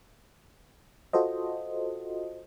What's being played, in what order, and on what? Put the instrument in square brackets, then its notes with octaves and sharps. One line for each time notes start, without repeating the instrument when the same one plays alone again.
[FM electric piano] F4 F#4 A4 C5 D#5